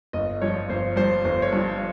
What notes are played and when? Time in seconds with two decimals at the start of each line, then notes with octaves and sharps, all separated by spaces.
0.13 G1 D#5
0.41 G2 F3 C#5
0.69 G1 C5
0.96 G2 F3 C5
1.25 G1 C5
1.42 C#5
1.52 G2 F3